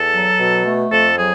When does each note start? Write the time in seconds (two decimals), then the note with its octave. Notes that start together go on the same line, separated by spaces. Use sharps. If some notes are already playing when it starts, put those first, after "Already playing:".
Already playing: E2 A4
0.13 F#3
0.39 B2
0.64 A3
0.91 F2 A4
1.17 F#3 G#4